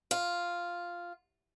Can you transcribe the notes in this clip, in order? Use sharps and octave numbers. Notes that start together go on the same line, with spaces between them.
F4